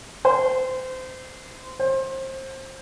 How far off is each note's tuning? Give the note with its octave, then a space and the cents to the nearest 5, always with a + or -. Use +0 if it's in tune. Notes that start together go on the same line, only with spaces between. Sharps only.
C5 -25
C5 +25